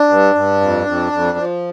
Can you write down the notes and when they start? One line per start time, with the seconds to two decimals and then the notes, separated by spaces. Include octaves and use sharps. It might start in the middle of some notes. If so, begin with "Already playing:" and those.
Already playing: D4
0.09 G2
0.35 G2
0.61 F2
0.87 F2
1.12 F2
1.38 F3